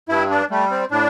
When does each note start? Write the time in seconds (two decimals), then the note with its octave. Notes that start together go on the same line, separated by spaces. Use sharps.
0.09 G2 E4
0.30 D4
0.50 G3 A3
0.70 C4
0.91 A2 D4